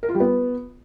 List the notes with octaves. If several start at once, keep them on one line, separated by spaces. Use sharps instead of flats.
A#4
F4
G3
B3